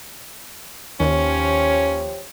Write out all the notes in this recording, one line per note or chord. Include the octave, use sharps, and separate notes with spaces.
D#2 F3 C#4 G4 C#5